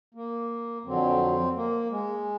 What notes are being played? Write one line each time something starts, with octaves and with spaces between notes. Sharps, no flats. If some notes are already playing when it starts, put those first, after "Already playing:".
A#3
F2 D3 F#3 C4
A#3
G#3